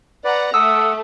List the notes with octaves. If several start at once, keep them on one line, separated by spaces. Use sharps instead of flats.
B4 D5 F#5 A#5
A3 A4 F#5 D#6 E6